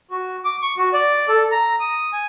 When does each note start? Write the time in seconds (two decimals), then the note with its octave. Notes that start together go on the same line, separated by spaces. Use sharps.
0.11 F#4
0.45 D6
0.62 C#6
0.77 F#4
0.93 D5
1.28 A4
1.52 A#5
1.80 D#6
2.13 G#5